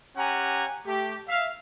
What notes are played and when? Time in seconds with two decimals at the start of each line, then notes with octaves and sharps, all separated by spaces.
0.16 C#4 G4 F#5 G#5 A#5
0.86 A3 G4
1.29 E5 F5